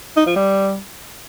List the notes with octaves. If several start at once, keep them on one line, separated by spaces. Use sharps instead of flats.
D#4
F3
G3